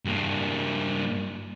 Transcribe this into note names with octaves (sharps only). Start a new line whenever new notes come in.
G2 A#3